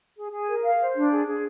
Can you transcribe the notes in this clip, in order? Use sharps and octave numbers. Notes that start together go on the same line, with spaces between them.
G#4
G#4
A#4
F5
C5
D4
G#4
G#4